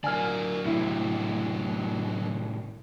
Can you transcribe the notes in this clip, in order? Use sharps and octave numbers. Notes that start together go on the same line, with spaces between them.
D3 F#3 A#4 D5 G#5 F6
A2 C3 E4